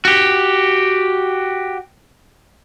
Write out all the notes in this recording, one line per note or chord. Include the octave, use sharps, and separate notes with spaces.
F#4 G4